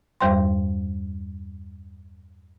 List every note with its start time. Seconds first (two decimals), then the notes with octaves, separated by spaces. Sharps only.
0.21 E2 G2 G3 C5 G5 C6